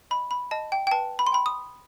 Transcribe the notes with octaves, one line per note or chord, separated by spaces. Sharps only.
D#5 B5
B5
D#5 A5
G5
G5
B4 A5
B5
C6
G5 B5
D#6